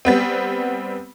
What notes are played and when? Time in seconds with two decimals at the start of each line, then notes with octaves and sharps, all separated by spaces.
0.05 G3 B3 C4